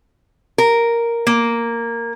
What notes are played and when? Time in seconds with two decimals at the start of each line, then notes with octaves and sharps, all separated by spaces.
0.58 A#4
1.27 A#3